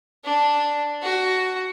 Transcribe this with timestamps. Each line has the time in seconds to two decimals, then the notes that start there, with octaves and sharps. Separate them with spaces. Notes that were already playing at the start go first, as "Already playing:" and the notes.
0.25 D4
1.02 F#4